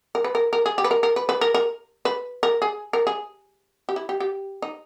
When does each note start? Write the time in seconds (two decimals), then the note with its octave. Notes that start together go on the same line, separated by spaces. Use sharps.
0.15 A#4
0.24 B4
0.35 A#4
0.53 A#4
0.66 G#4
0.78 G4
0.84 B4
0.91 A#4
1.03 A#4
1.16 B4
1.29 B4
1.41 A#4
1.54 A#4
2.05 B4
2.43 A#4
2.62 G#4
2.93 A#4
3.07 G#4
3.89 G4
3.96 E4
4.09 G4
4.20 G4
4.62 D#4